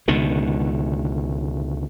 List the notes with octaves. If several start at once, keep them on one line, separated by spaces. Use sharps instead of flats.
C#2 B2 D3 D#3